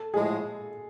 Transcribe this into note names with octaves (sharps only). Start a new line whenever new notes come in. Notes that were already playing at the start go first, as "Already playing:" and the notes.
Already playing: A4
A2 F3 G#3 G#4